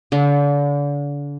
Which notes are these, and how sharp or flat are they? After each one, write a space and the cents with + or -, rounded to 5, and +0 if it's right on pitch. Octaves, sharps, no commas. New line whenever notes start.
D3 -35